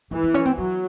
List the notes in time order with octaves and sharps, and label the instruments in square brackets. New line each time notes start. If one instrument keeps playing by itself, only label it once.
[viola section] E3 [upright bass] A#3
[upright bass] B3
C#4
C4
[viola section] F#3 [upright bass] B3